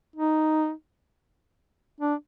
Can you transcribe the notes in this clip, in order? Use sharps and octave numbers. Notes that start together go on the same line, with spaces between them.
D#4
D4